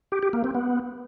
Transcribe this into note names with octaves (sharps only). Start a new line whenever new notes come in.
G4
G4
A#3
C4
B3